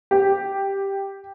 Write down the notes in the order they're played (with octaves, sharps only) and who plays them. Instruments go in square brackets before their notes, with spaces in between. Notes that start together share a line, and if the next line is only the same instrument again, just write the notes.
[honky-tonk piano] G4